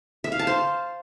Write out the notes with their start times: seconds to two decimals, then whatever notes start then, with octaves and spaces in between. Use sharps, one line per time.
0.24 E5
0.32 F5
0.39 A5
0.47 C5